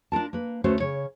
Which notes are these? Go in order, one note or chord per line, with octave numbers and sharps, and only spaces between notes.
D4 F4 A#4 A5
A#3 B4
D2 A3 C#4 F#4 B4 C5
C#3 C#5